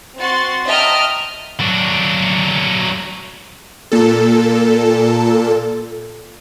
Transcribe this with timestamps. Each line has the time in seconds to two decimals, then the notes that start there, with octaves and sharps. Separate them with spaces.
0.17 C4 F#4 C6 A6
0.66 D#5 E5 G5 A5 A#5 F6
1.60 F#3 D4
3.92 A#2 A4